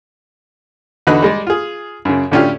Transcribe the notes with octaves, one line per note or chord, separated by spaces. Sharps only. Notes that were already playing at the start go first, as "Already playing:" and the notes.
E2 D3 D#4 F#4 B4 F#6
G3 G#3 D5
F4 G#4
F#2 C#3
A2 D3 C#4 D4 F4 G4